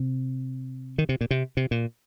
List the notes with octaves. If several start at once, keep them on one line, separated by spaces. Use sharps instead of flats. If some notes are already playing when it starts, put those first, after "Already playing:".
Already playing: C3
D#3
C3
A#2
C3
C3
A#2